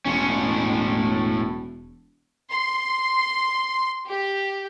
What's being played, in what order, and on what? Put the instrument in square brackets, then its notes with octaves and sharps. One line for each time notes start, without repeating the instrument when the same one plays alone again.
[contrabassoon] E1 [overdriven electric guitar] A2 C#4
[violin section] C6
G4